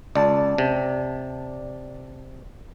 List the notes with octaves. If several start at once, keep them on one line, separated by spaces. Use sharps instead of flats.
C#2 D5 A5
C3